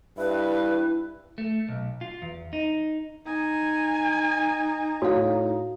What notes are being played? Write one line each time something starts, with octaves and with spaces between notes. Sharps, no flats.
G2 E4 B4
A3
B1
F4
E2
D#4
D#4 G#5
A2 F#4 C#5 F5 D#6